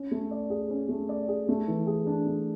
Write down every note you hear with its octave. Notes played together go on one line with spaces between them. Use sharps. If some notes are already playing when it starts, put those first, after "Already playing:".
Already playing: C#4
A3
D5
G#4
C#4
A3
D5
G#4
A3
E3
G#4
D4
A3